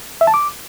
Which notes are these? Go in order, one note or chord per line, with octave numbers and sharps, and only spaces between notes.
E5
A5
D6